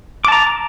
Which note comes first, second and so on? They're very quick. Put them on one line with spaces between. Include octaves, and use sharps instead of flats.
D6 A5 A#5